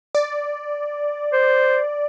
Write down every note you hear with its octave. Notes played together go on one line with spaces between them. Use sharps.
D5
C5